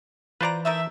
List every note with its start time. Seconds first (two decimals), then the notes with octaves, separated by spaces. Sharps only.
0.41 E3 F4 B4 C5 D5 A5 A#5
0.65 A3 D#4 A#4 E5